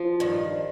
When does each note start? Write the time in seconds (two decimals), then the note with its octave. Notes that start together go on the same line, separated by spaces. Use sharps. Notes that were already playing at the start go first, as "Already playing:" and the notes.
Already playing: F3
0.20 G2 D#3